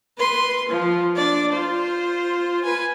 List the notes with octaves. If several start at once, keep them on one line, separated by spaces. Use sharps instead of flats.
B4 C6
F3
D4 D5
F4 C5
B4 G#5